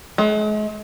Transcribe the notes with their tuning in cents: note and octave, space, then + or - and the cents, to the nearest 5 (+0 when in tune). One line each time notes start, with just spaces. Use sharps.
G#3 +40